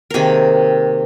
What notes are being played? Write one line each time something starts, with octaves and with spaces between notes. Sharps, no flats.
C3 D#3 A#3 G#4 A#4